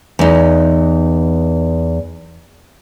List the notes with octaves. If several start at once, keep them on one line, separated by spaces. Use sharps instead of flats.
E2 D#4